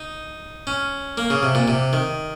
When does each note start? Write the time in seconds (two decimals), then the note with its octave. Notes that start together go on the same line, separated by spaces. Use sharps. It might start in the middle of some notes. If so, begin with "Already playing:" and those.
Already playing: D#4
0.67 C#4
1.18 A#3
1.30 C#3
1.43 C3
1.55 A#2
1.68 C3
1.93 D#3